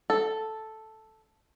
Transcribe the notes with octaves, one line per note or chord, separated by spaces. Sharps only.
A4